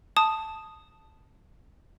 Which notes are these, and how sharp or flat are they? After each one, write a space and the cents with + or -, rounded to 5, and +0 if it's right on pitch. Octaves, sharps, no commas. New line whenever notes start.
A5 +0 D#6 +0